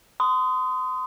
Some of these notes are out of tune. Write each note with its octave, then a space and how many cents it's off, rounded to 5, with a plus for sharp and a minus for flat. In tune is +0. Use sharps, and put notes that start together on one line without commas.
C6 -35 D#6 +0